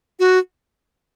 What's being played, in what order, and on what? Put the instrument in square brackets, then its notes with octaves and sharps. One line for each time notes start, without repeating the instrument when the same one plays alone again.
[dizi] F#4